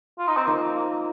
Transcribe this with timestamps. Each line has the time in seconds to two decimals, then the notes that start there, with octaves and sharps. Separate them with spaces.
0.19 F4
0.28 D#4
0.37 C4
0.47 F3 A#3 D#4 A#4
0.75 A#3